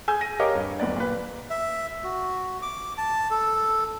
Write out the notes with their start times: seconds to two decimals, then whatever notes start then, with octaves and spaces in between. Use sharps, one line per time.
0.08 G#4 G#5 E6 G6
0.21 A#6 D#7
0.39 G4 A#4 C#5 D#5 F5 D6
0.55 G2
0.79 D1 B3 D5
0.96 A#2 B4
1.50 E5
2.04 F#4
2.62 D6
2.98 A5
3.31 A4